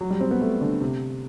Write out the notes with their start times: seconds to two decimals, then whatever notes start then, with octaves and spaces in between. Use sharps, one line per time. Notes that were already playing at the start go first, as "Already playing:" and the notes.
0.01 F#3
0.10 G3
0.21 C4
0.31 B3
0.41 A3
0.61 D3
0.82 C3